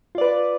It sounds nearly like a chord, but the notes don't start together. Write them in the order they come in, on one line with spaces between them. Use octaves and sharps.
F4 D5 B4